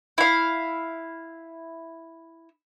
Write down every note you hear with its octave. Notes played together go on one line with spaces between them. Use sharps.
E4 F5